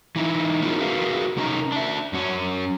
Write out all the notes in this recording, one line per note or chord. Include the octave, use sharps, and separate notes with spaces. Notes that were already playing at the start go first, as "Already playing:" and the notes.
E3 D#4 E4
B3 C#4 D#4 F4 F#4 A#4
F#4 G#4 A#4 B4 E5 F5
C3 C#4 D#4 A#4 D#5 A#5
D4 E5
F#2 C#4